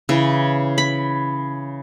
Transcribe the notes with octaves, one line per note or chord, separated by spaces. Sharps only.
C#3 E3
B5